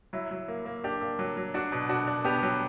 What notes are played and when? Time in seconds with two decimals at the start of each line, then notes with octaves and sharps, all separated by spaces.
0.13 F#3 E4
0.31 F#3
0.48 A#3
0.66 A#3
0.84 D4 G4
1.01 A#3
1.19 F#3
1.37 F#3
1.54 D4 F#4
1.72 B2
1.89 D4 F#4
2.07 D4
2.25 B3 G4
2.42 F#3